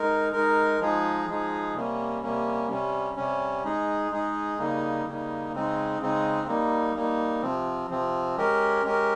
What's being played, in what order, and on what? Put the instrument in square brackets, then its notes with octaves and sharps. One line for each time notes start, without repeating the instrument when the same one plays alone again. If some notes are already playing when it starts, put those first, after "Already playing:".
Already playing: [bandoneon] G#3 D#4 A#4
G#3 D#4 A#4
F3 G#3 D#4 G#4
F3 G#3 D#4 G#4
C3 G3 A#3 C#4
C3 G3 A#3 C#4
C3 G3 C#4
C3 G3 C#4
G#3 D#4 G#4
G#3 D#4 G#4
C#3 G3 A#3 D#4
C#3 G3 A#3 D#4
C#3 G#3 C4 D#4
C#3 G#3 C4 D#4
G3 A#3 D#4
G3 A#3 D#4
C3 F3 C4
C3 F3 C4
G#3 C#4 G4 A#4
G#3 C#4 G4 A#4